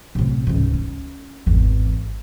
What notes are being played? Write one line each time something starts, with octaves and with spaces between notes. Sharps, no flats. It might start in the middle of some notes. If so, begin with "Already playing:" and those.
A2 C3
C#2 G#2
C#4
G#1 E2